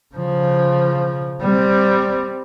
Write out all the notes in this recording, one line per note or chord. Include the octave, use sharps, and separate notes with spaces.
C#3 F3
G3 C4